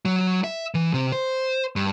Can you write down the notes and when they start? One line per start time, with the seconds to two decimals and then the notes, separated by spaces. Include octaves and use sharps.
0.05 F#3
0.44 E5
0.74 E3
0.94 C3
1.12 C5
1.76 G2